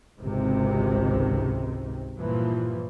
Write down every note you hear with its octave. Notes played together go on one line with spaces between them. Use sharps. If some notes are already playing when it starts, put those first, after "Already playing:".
G#1 C#2 C3 D#3
G2 A#2 E3 F3